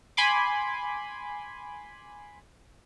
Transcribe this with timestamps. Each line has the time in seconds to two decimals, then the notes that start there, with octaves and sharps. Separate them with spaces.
0.17 G#5 B5 C6 D6